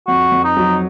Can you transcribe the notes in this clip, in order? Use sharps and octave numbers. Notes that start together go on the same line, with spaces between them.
F2 F#4
F2
D#4
F#3